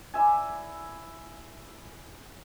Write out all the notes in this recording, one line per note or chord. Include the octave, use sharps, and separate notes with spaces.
E4 D5 E5 G#5